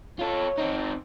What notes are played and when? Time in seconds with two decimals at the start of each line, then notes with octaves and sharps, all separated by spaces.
0.19 F4 A4 C#5
0.58 C4 D#4